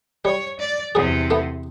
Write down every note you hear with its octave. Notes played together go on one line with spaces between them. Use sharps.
G3 C#5
D5
E2 C3 F#3 G#4
A3 B3